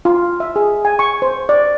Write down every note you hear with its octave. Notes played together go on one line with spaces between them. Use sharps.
F4
E5
G#4
G#5
C#6
C5
D5